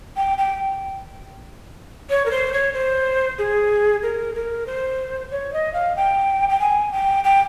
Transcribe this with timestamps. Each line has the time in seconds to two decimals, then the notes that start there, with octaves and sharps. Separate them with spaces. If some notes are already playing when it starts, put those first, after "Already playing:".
0.16 G5
0.38 G5
2.10 C#5
2.26 A#4
2.31 C5
2.53 C#5
2.74 C5
3.38 G#4
4.03 A#4
4.35 A#4
4.66 C5
5.31 C#5
5.53 D#5
5.74 F5
5.96 G5
6.49 G5
6.60 G#5
6.92 G5
7.24 G5